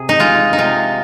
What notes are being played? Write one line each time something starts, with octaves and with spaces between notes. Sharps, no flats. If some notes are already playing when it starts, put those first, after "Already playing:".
Already playing: C3 G#4
D#4
G#3 F4
D#4
C3 F4